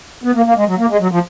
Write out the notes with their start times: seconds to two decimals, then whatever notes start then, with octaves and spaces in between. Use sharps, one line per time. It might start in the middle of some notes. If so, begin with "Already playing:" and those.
0.24 B3
0.35 A#3
0.46 A#3
0.57 G#3
0.67 F#3
0.78 A#3
0.89 G#3
1.00 F#3
1.11 F3